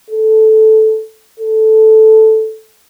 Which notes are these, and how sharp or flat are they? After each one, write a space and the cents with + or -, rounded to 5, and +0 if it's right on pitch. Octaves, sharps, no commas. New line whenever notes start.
A4 -10
A4 -5